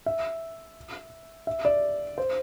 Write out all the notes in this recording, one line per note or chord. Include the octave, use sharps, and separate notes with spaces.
E5
E5
D5
C5